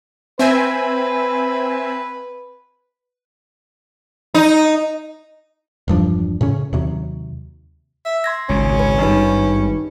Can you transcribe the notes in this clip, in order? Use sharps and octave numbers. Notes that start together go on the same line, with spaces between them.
C4 B4 E5 G#5
D#4
E1 G2 F3 D4
A2 C#3 C#4
D#2 C3 F#3
E5
C6 G#6 A#6
G#1 C#2 A#2 C#4
B4
G2 G3 D#4 G4 B4